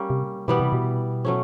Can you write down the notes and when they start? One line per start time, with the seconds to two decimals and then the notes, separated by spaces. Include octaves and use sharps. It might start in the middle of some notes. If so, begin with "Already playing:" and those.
Already playing: G3 A#3 C#4
0.10 C3
0.48 B2 E3 G3 B3
0.60 C3
0.73 B2
1.25 F#3 A3 C#4